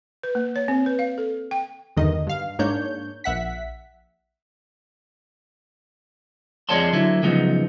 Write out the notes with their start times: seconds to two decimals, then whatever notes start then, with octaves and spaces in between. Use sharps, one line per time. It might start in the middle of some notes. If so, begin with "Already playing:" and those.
0.23 B4
0.35 A#3
0.56 C#5
0.68 C4
0.86 B4
0.99 F5
1.18 A4
1.51 G5
1.97 E2 G2 D3 D#3 D#5
2.27 G2 F5
2.59 G#2 A#3 D4 C#5 G6
3.24 A#1 E5 F#5 B6
6.69 F2 G#3 C#5 D5 A5 C6
6.93 D3 F#3 E4
7.23 C#3 F3 F#3 G#3 B3 D#4